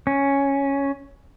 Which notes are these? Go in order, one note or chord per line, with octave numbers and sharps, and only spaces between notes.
C#4